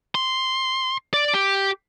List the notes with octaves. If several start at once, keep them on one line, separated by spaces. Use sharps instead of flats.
C6
D5
G4